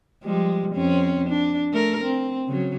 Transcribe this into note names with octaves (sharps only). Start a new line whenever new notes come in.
F3 G3 G#3
F2 C4 C#4
D4
A3 A#4
C4
C#3 F#3